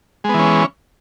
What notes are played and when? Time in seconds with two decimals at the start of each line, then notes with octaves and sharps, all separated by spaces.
0.24 G#3
0.29 B3
0.34 E3
0.39 C#4